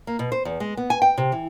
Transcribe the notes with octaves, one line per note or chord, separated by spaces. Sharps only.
A#3
B2
C5
E2
G#3
B3
G#5
G5
C3
E3